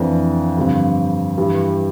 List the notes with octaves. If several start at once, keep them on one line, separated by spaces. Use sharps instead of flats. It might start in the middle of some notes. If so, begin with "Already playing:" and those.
Already playing: F2 E3 A3 D4
G2 D3 F3 C4
G2 E3 G3